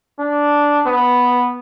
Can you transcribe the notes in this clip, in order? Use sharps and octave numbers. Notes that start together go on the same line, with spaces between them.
D4
B3